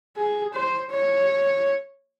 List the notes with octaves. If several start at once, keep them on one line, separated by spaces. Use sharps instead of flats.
G#4
C5
C#5